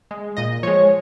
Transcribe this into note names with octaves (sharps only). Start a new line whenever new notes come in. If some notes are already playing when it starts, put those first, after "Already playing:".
G#3
A#2 D#5
F3 G#3 C#5